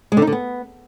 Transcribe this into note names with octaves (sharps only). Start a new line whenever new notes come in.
G#3
D3
D#4
D3
B3